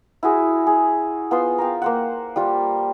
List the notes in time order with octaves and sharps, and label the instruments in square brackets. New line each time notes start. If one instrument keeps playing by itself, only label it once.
[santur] E4 F#4 G#4 C5
G#4
B3 F4 C5 C6
A#4 F5 G5
A#3 C5 F#5
G3 F4 C5